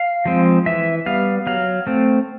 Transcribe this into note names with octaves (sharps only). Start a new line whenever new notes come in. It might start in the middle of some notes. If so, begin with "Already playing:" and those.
Already playing: F5
F3 G#3 C4
E3 E5
G3 B3 F5
F#3 F5
A3 C4